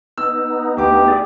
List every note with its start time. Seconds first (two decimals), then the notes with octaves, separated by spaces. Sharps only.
0.18 B3 D#4 E6
0.77 D2 G4 D6
1.08 G#4 D5